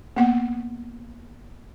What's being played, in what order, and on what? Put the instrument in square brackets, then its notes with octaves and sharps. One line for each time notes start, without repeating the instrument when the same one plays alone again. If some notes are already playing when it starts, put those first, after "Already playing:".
[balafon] A#3 B3 F#5